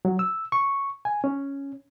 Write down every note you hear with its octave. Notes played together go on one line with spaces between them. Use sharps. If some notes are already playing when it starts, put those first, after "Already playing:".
F#3
E6
C#6
G#5
C#4